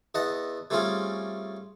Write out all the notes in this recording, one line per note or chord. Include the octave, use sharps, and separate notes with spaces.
E2 D#5 F#5 A5
G3 A3 C4 C#4 F4 G#4